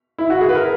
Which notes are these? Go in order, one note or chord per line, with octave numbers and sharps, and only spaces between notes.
E4
F#4
G#4
B4
A#4